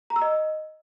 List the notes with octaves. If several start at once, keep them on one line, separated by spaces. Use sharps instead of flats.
A#5
E6
D#5